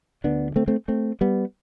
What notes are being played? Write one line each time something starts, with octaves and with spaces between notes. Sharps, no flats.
D2 D3 B3 D4
A3 C4
A3 C4
A3 C4
G3 B3